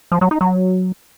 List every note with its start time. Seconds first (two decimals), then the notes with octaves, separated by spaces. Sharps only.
0.12 F3
0.21 F#3
0.31 D#4
0.41 F#3